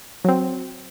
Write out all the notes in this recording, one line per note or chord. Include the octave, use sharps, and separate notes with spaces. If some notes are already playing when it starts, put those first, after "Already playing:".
F#3 C4